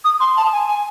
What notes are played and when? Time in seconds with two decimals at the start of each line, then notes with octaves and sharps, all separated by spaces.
0.04 D#6
0.20 C6
0.36 A5
0.52 G#5
0.68 G#5